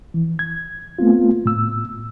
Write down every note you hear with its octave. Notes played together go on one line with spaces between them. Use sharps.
E3
G#6
A3 B3 C4 F4
A2 E6